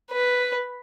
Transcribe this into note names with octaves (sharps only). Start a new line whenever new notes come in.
B4